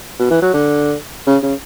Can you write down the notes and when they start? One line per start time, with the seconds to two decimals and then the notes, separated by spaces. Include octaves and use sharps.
0.19 B2
0.30 E3
0.42 F#3
0.53 D3
1.26 C#3
1.43 C#3